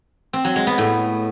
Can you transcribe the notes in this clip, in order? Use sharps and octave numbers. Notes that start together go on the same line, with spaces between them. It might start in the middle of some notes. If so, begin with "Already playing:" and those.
C4
F#3
G#3
B3
A2